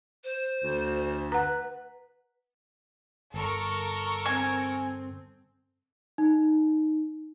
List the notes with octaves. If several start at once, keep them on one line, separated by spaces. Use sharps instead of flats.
C5
D2
B4 F#5 A#5 F#6
G1 A4 A#4 C#6
C4 G#5
D#4